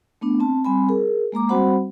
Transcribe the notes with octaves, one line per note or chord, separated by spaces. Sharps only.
A3 B3 D4
C4 A5
G3 C4 G#5 B5
G#4 A#4
G#3 A#3 A#5 D6
G3 C4 F#4 C5 F#5 B5